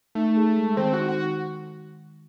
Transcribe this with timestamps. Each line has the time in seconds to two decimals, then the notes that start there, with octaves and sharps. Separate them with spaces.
0.15 A3 D#4
0.37 G#4
0.57 G#3
0.77 D#3 C4
0.93 D#4 F#4
1.08 F#4